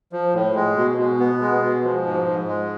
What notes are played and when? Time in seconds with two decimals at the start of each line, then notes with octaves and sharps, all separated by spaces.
0.13 F3
0.34 A2
0.55 G#3
0.76 B2
0.98 B2
1.20 B3
1.41 G#3
1.62 B2
1.84 F3
2.06 G#2
2.27 G#2
2.48 G#3